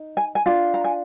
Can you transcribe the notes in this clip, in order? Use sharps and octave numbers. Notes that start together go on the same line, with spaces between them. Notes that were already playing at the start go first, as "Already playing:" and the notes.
Already playing: D#4
G#5
G#5
D4 F4
A#5
G#5